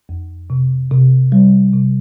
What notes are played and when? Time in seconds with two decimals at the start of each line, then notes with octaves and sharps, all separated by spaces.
0.09 F2
0.50 C3
0.91 C3
1.32 G3
1.73 C3